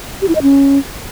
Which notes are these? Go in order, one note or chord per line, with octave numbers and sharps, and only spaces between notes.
G4
E4
D#5
C#4